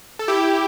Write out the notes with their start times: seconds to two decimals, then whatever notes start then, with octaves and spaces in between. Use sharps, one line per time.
0.19 A4
0.28 E4 G4